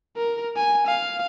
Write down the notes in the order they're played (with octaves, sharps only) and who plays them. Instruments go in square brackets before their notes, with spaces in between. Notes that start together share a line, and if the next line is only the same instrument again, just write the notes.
[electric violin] A#4
G#5
F5